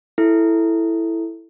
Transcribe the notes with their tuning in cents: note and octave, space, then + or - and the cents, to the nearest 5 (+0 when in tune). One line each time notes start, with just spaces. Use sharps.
E4 +0 A4 +0